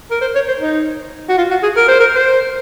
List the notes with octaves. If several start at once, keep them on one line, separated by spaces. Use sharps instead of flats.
A#4
C5
C#5
C5
D#4
F#4
F4
F#4
G#4
A#4
C5
A#4
C5